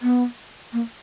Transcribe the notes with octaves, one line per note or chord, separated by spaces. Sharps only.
B3
A#3